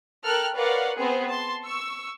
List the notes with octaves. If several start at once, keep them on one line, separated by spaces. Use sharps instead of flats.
A4 A#4 G5 F6 F#6
A#4 B4 C#5 D5 F5 F#5
B3 C4 G#4 B4 C5
A5 C6
C#6 E6